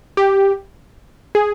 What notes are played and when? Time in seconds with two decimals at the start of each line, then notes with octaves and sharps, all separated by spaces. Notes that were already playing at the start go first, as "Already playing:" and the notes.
0.17 G4
1.35 G#4